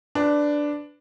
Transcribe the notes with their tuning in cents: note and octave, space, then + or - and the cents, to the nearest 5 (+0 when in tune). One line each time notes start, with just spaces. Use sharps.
D4 +0 B4 +15